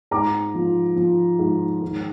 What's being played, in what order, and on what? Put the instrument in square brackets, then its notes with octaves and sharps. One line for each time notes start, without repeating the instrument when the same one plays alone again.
[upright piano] G#2 A#5 D6
F3
F3
G#2
D#3